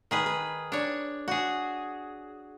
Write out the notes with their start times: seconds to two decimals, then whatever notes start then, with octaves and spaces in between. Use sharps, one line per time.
0.11 D#3 G#4 B4
0.26 B4
0.72 D4 C#5
1.28 F#4 G#4